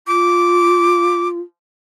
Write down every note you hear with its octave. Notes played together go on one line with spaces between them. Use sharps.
F4 D6